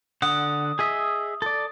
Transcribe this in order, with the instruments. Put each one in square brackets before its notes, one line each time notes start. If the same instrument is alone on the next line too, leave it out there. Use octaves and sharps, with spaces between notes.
[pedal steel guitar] D3 F#5 [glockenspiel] D#6
[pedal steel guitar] G#4 D#5 E5
A4 D5